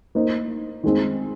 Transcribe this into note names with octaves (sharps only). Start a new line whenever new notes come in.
A#3 D#4 C5
D#3 G#3 C4 D#4